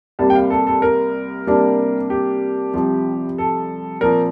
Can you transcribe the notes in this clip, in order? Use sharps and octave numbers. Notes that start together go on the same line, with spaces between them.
C2 C3 G3 A#3 A5
G5
F5
A4
A4
A#4
C3 G3 A#3 D4
G4
C2 C3 F3
A4
A#2 F3 C4 A#4